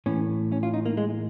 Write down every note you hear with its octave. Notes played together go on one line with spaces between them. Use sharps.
A2 E3 C#4
C#4
F4
D#4
A#3
G#3